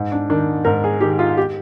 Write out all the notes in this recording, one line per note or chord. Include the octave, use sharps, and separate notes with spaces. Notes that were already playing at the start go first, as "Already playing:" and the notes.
Already playing: G#2
D4
D#3 D4
G#2 A#4
G#4
D#3 G4
F4
G4